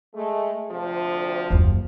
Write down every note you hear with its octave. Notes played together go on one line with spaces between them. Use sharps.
G#3 A3
D2 C3 F3
F#1 D#2